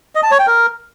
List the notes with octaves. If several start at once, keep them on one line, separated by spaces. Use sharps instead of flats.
D#5
A5
C#5
G5
A#4